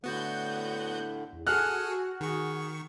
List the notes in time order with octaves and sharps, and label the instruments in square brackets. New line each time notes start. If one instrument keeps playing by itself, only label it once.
[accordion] A2 D3 [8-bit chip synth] B3 F#4 [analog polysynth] F#6 G6
[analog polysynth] E2
[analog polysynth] F#4 [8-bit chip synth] G#4 A4 F#5 [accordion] G#5 [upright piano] F6 F#6
[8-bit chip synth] D#3 C#6 [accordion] G#4